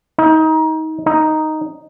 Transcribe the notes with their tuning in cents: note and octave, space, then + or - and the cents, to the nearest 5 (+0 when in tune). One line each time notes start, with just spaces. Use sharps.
D#4 +25
D#4 +0